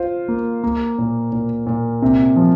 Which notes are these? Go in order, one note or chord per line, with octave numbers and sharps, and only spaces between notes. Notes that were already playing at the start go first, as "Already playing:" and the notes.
Already playing: F4 C5
A#3
A#3
A#2
A#2
A#2
C3
F3